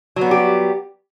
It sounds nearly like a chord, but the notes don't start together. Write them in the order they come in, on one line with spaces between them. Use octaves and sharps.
F#3 B3 G3 G4